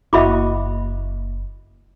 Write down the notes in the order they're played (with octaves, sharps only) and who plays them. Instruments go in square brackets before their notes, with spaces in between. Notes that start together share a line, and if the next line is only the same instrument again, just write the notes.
[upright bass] F#1 A#3 [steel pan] E4 F#4 D#5 [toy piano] E5 B5 D6